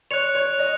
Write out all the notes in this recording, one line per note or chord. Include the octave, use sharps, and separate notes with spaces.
C#5 F#6 C#7 F7
C#5
D#5